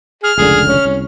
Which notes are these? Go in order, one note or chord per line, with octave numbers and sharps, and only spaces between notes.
G#4 F6
F1 C#2 D3 G#4
C#4
C2